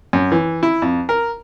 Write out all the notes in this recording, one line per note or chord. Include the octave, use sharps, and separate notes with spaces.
F#2
E3
E4
F2
A#4